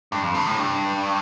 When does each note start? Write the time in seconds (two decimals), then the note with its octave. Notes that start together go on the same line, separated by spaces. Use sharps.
0.12 G2
0.23 F2
0.35 G2
0.46 A2
0.57 G2